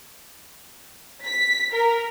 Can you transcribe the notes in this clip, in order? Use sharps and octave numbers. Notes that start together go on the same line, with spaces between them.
B6
A#4